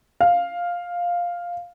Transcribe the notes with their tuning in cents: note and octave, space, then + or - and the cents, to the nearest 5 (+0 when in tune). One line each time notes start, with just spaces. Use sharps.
F5 +5